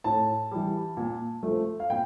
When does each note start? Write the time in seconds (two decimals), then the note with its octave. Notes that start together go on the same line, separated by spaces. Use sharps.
0.04 A2 A5
0.51 E3 G3
0.97 A#2
1.43 F3 A3
1.80 F5
1.90 A#2 G5